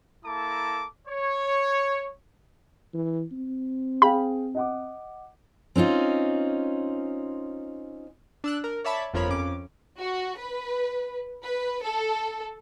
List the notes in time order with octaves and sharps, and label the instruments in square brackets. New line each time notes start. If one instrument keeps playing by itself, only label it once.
[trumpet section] A#3 E4 A4 A5 A#5 D6
C#5
[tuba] E3
C4
[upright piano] G#4 F5 G5 [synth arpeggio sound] B5
[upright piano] D#5 F#5 D6
[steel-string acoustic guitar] C4 C#4 D#4 F4
[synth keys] D4 E6 F#6
A#4
C#5 D5 E5 A5 B5
G1 F2 F3 A#4 C#5 B5
F2 C#4 D6
[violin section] F#4
B4
B4
A4